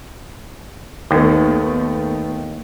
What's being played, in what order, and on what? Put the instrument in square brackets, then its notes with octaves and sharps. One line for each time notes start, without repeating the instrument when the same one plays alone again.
[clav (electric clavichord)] D#2 [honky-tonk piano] D#3 A3 B3